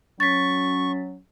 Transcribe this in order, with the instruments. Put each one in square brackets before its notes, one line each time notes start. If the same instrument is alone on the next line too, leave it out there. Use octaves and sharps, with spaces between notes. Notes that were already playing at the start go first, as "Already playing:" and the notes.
[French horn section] F#3 C#4 [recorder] C#6 [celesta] A6 B6